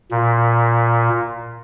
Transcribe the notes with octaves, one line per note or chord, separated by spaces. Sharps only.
A#2